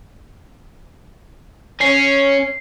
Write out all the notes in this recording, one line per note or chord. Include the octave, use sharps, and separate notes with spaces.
C#4 C7